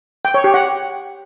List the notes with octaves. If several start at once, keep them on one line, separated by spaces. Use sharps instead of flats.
G5
C#5
G4
F#5